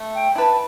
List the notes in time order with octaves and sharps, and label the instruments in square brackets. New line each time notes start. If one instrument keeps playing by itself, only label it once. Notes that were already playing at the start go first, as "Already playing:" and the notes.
Already playing: [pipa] A3
[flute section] G5
[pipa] E4 B4 [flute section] A5